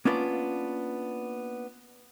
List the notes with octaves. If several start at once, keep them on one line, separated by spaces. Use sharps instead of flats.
A#3 B3 C#4 D4 F4 B4